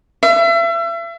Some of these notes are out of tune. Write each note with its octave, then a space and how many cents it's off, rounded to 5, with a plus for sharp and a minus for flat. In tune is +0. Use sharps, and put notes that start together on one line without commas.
E5 +35